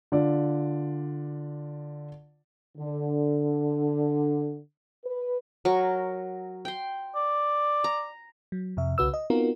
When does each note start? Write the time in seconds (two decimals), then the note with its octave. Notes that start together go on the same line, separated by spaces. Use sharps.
0.12 D3 F4 D5
2.78 D3
5.05 B4
5.65 F#3 A#4 C#6
6.65 G5 C6
7.16 D5
7.84 A#5
8.52 F#3
8.77 F2 C3 E5
8.98 C2 C#3 F#4 B4 E6
9.14 D#5
9.30 B3 C4 D#4 F4 F#4 A#4